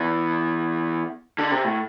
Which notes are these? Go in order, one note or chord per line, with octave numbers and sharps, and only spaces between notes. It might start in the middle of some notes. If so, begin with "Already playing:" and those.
Already playing: E2
D3
C3
A2